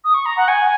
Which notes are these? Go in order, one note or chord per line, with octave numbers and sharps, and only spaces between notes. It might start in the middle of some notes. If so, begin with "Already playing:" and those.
D#6
C#6
A#5
F#5
G#5